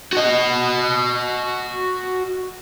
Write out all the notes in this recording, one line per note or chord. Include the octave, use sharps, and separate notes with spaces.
F#4 D#5